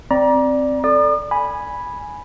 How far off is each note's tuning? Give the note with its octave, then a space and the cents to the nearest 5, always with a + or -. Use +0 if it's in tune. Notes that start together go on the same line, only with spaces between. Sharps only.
C4 +0 D5 +0 A#5 +30
A4 +0 D5 +0 D#6 -45
G#5 +0 B5 -5